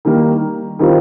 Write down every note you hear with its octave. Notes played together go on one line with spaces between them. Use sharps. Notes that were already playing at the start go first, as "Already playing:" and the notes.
D#3 G3 A#3
D#3 G3 C4 F4